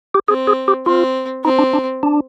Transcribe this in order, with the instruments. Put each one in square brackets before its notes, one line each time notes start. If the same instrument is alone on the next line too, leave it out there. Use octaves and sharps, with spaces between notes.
[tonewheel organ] G4
[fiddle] C4 [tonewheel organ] G#4
[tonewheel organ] G#4
G4
[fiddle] C4 [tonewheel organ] F4
[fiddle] C4 [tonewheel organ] D#4
[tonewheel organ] D4
D4
D4